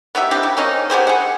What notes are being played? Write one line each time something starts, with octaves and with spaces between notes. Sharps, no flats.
B3 D#4 G4 E5
C4 D4 E4 G4
C#3
C4 C#4 D#4
B3 G4 G#4 C5
G#4 F#5